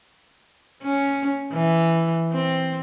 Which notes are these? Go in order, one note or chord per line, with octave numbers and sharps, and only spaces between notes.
C#4
E3
C4